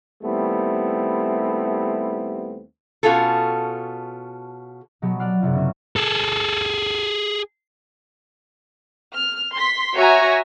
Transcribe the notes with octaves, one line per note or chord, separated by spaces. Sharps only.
D#2 G3 A3 B3 C4 E4
B2 C#4 F4 G#4 A4
B2 F#3 B3 G4
D5 F#5 F6 C7
F#1 C3 F4
C#3 A#3 C4 C#4
G#4 A4
F6
C6 B6
F#4 C#5 E5 G#5 A#5